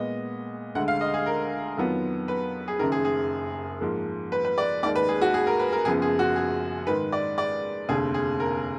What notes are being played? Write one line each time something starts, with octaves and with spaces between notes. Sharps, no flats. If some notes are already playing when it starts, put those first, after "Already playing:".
Already playing: A#2 G#3 B3 D#5
D2 D3 G#3 F#5
F5
D#5
G#4
A#4
F2 D#3 F#3 B3 F4
B4
G#4
F#1 F#2 D#3 A#4
G#4
G#4
G#2 F3 A#3
B4
B4
D5
D#2 D#3 G#3 D5
B4
G#4
F#4
G#4
A#4
B4
A#4
F#1 F#2 F3 B3 G#4
G#4
F#4
G#4
G#2 D#3 G#3 B4
D5
D5
F1 D#2 D3 G#4
G#4
A#4